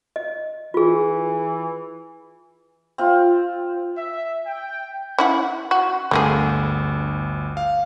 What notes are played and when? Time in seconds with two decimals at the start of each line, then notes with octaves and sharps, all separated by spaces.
0.16 D#5
0.74 E3 F4 G#4
2.98 C4 F4
3.97 E5
4.46 G5
5.18 C#4 E4 F#5
5.71 F#4
6.11 G1 D2 D3 A#3 G#4
7.57 F5